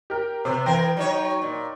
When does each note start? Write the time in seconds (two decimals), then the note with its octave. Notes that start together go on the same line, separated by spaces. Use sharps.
0.10 G4 A#4
0.45 C3 B3
0.66 E3 A#4 C5 G5
0.97 F#3 D#4 C#5
1.42 A#2